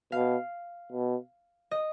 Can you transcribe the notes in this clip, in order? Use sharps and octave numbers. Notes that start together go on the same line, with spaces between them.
B2 F5
B2
D#5